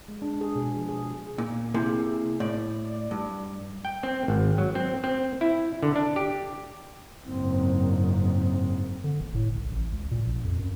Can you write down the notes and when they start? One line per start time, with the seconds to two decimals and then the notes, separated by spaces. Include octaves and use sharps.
0.08 G#3
0.22 D4
0.41 G#4
0.56 B2
0.76 F3
0.89 G#4
1.38 A#2
1.74 C3 A#3 E4 G#4
2.40 A2 D5
3.11 G2
3.85 G5
4.03 C4
4.28 G#1
4.58 F#3
4.75 C4
5.04 C4
5.41 E4
5.83 D3
5.96 D4
6.16 G4
7.25 F#1 G#2 C4
8.16 C4
9.04 D3
9.21 F#1
9.35 A2
9.55 C2
9.70 A1
9.92 C#2
10.11 A#2
10.24 A#1
10.45 F2
10.59 F#2